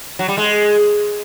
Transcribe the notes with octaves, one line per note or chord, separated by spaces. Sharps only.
F#3
G3
G#3